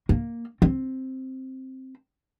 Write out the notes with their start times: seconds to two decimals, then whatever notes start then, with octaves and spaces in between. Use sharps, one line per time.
0.09 A#3
0.62 C4